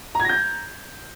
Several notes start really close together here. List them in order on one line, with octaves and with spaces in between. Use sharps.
A#5 G#6 A#6 G6